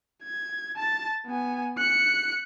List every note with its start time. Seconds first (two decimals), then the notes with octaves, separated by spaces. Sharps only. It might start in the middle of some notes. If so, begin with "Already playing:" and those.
0.23 G#6
0.76 A5 A6
1.26 B3 G#5
1.78 F#6 C#7